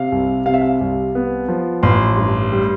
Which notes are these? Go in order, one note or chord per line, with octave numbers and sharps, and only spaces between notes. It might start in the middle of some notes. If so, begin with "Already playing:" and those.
Already playing: C3 F5
C2
C3 F5
E5
F5
C2
B3
F3
A1 C6
G2
G3